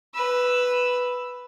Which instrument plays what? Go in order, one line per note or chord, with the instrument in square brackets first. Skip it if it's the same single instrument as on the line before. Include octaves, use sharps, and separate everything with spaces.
[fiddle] B4 E6